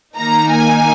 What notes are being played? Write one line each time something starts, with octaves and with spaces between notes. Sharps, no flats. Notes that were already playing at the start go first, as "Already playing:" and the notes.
D#3 A#3 D#4 A#5
G#5